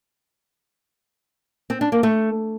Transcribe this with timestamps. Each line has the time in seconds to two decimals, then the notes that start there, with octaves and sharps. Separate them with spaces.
1.70 C4
1.81 D4
1.92 A#3
2.03 A3